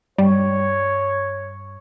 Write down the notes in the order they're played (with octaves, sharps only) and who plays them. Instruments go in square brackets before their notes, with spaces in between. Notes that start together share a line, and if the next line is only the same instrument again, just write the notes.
[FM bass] G2 [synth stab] G3 [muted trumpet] C#5